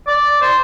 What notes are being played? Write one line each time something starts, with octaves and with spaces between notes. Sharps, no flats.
D5
C5